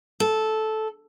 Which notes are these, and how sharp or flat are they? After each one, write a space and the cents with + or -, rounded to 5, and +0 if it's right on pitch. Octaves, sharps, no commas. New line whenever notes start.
A4 -10